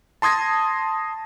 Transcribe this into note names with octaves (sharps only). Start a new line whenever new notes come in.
A5 C6 D#6 G#6 A#6